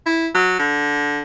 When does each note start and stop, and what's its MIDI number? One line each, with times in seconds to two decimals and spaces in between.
0.06 0.27 64
0.35 0.56 54
0.59 1.22 50